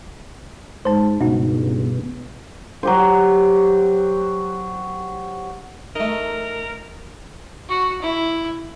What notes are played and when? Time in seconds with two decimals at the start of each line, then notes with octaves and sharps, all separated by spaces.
0.85 G#2 C5 A5
1.21 C#2 G2 B2 D#4 F#4
2.83 F#3 G4 C5
5.96 A3 D#4 A#4
7.69 F#4
8.02 E4